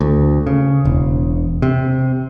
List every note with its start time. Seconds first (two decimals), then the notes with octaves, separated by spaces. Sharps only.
0.01 D2
0.47 C#3
0.85 E1
1.62 C3